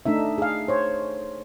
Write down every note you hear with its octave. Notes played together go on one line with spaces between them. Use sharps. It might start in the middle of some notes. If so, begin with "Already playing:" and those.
A3 D4 D#4 E5
G#4 F5
C5 C#5